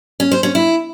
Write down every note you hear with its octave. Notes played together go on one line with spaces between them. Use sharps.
C#4
C5
C#4
E4